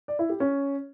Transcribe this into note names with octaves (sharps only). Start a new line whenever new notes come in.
D5
E4
G4
C#4